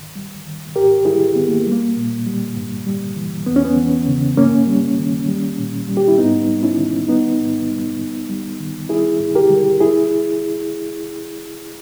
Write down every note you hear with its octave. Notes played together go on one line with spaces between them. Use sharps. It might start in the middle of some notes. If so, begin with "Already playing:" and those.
Already playing: G2 D#3
G3
D#3
G#2 G4 A#4
G3 E4 G#4
D#3 B3
A#3
G3
A#3
A#2
G3
G2
G3
E3
E2 B3
C#4
B3
E3
C#3
G2 A#3 C#4
G3
D#3
G3
A#2
G3
G4
E4
G#2 B3 D#4
G3
C#4 E4
D#3
G3 B3 D#4
G#2
G3
G2
G3
D#3
G3 E4 G#4
G2
G4 A#4
G3
E4 G#4